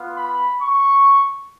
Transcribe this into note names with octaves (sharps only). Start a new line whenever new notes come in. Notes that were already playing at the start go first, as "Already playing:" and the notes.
Already playing: B3 F4
B5
C#6